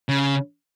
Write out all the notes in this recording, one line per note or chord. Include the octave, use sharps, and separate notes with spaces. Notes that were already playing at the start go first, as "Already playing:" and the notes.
C#3